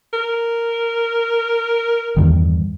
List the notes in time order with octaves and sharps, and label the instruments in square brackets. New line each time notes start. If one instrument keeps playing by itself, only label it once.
[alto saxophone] A#4
[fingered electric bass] E2 G2 D#3